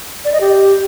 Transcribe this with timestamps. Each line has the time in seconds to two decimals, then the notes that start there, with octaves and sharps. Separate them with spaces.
0.25 D5
0.33 D#5
0.41 G4